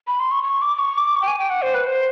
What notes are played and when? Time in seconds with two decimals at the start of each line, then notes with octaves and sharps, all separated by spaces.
0.07 B5
0.20 C6
0.31 C#6
0.43 C#6
0.62 D6
0.79 C#6
0.98 D6
1.16 C#6
1.22 G5
1.27 G#5
1.38 G5
1.50 F#5
1.62 C5
1.74 B4
1.87 C5